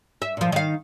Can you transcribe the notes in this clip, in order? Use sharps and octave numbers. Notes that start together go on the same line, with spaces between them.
E5
A#2 F3
D#3 F5